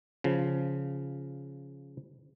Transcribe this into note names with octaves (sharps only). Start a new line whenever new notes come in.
C#3 F3